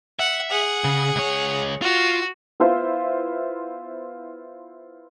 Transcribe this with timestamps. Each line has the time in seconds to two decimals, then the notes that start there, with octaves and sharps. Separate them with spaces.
0.19 E5 F#5
0.51 G#4 F#5
0.84 C#3
1.16 C#2 C#5
1.82 F4 F#4
2.60 B3 E4 F4 C5 E5